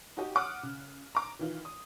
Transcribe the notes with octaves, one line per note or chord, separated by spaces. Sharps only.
D#4 F#4 G4
F#5 D6 D#6 F6 F#6
C#3
A#5 D6
D#3 E3 F4
D#6